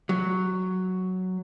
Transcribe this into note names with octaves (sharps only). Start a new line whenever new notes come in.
F#3